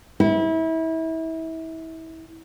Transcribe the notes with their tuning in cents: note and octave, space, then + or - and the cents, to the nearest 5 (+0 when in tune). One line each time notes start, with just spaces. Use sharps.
E4 -30